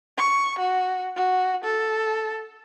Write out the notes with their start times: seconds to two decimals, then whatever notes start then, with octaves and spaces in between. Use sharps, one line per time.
0.17 C#6
0.59 F#4
1.16 F#4
1.64 A4